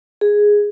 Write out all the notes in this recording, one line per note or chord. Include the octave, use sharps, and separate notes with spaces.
G#4